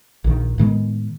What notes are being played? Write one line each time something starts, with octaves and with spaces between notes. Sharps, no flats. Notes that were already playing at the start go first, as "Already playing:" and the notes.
A#1 D#3
A2 D#3 G#3 B3